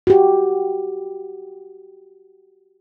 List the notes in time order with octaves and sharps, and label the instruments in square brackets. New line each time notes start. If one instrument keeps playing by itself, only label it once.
[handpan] F#4 G4